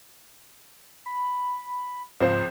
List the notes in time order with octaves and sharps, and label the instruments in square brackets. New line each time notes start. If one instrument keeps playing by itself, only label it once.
[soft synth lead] B5
[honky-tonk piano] C#2 F3 C5 [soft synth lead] G#2 [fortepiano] C4